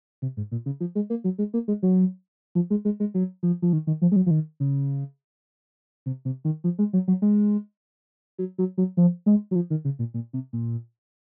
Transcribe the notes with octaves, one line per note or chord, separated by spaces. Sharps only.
C3
G#2
A#2
C#3
F3
G#3
A#3
F#3
G#3
A#3
G#3
F#3
F3
G#3
G#3
G#3
F#3
F3
F3
D#3
D#3
F3
G#3
F#3
F3
D#3
C#3
C3
C3
D#3
F3
G#3
F#3
F#3
G#3
F#3
F#3
F#3
F3
G#3
F#3
F3
D#3
C#3
A#2
A#2
C3
A#2